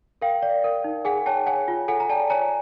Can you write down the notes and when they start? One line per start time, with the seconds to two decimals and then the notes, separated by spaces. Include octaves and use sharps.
0.22 A#4 F5 G5
0.42 D5
0.64 A#4
0.84 D#4
1.05 G#4 F#5 G#5
1.26 C#5 G5 A5
1.46 C#5 F#5 G#5
1.68 F4
1.88 A4 F#5 G#5
2.00 A#5
2.09 D5 G5 A5
2.30 C#5 G#5 A#5